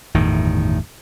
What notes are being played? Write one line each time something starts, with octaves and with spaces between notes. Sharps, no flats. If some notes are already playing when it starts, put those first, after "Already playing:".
G1 E2 A2 D#3